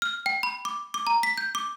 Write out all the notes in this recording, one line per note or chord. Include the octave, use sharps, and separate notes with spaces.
F6
G5
B5
D6
D6
A#5
B6
G6
D6